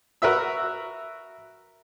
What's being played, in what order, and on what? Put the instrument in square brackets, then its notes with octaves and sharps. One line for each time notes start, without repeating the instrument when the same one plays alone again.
[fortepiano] F#4 A#4 B4 E5 E6